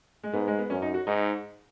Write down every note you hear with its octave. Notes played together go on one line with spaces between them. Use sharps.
G#3
G#2 B3
G#3
B3
F#2 C#4
D#4
F#4
G#2 D#4